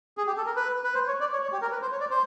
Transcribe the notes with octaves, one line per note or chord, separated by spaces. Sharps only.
G#4
G4
A4
A#4
B4
B4
C5
C#5
D5
C#5
C#5
G4
A#4
B4
C5
C#5
D5
C5